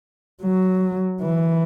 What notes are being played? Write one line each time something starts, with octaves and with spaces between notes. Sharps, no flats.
F#3
E3